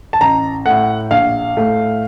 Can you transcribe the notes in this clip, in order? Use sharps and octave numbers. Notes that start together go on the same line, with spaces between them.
A5
A1 A#5
A2 A3 F#5
A#1 F5
A2 A3